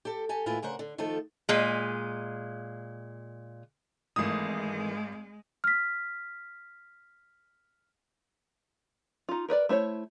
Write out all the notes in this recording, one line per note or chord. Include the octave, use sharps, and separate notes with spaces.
G4 A4
G4 A4 G#5
D#2 A2 E4 F4 B4 G#5
D2 C#3 A#4 C5 F#5
D3
D#3 F3 A3 F4 A4
A#2 G#3
G#1 D#3 E3 G#3 A3 D#6
F6 B6
D#4 F4
A#4 B4 C#5 D5
A3 E4 C5 C#5